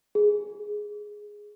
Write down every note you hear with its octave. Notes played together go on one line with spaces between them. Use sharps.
G#4